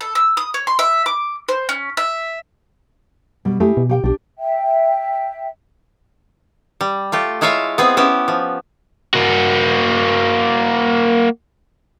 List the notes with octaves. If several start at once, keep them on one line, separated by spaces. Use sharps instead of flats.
A4
E6
D#6
C#5
C6
E5
D6
C5
C#4
E5
B2 G3
A3 E4 G4 G#4
B2
G4 F#5 G5
B1 D4 G4
E5 G5
G3
A3 F4 G4
G#3 E4 F4 C#5 E5 F5
B3 C4 G#4
B3 C#4 E4 G4
F3
A#3 F#4